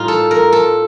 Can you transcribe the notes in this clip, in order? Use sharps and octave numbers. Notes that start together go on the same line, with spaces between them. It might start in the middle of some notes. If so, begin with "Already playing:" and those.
Already playing: A2 G3 D#4 F4
A4
A#4
A4